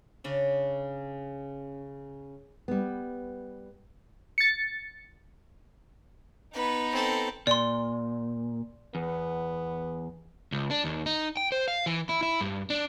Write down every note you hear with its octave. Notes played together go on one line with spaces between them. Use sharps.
C#3 C#4 D4
G3 B3
A6 C#7
B3 D#4 B4
C4 A4
A#2 D5 C6
E2 B3
C#2
D4
D#2
D#4
G5
C5
F5
E3
E4
E4
G2
D4